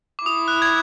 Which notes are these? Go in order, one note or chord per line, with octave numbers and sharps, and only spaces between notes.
D6
E4 D#6
F#6
G#6